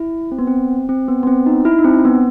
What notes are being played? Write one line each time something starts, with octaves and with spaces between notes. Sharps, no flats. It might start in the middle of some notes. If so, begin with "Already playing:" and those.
Already playing: E4
C4
B3
C4
C4
B3
B3
C4
D#4
E4
D#4
C4
B3